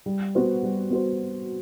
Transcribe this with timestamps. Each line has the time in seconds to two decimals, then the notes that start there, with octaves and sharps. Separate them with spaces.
0.06 G3
0.35 B3 F#4 C5
0.63 G3
0.90 B3 F#4 C5